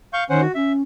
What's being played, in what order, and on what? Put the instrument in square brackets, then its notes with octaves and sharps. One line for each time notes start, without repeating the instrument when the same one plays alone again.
[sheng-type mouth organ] F5 C#6 G6
[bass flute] D#3 [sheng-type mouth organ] C#4 C5 F#5
[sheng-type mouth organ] F#4
[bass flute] C#4 [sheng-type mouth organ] E5